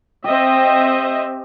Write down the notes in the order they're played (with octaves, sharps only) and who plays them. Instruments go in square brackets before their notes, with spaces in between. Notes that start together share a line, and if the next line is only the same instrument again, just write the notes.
[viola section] C4 D#5 E5 [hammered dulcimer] G4